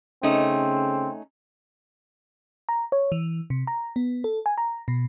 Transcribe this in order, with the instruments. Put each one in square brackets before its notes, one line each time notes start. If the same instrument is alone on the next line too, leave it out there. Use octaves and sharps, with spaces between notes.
[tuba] C#3 [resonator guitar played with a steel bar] A3 C#4 D#4 [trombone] C4
[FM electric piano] A#5
C#5
E3
C3
A#5
B3
A4
G#5
A#5
B2